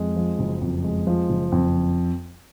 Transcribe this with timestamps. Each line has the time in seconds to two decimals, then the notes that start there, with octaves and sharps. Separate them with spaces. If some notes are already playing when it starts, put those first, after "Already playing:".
Already playing: F2 G#3
0.16 F3
0.39 F#1
0.61 F2
0.84 G#3
1.07 F3
1.30 F#1
1.52 F2